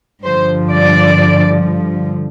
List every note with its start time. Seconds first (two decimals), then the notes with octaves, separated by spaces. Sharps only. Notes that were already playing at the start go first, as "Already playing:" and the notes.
0.25 G2 D3 F3 C5
0.70 D5